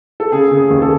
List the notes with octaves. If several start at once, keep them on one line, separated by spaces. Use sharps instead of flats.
A4
C#3 G#4
C#3
G#4
D#2
A4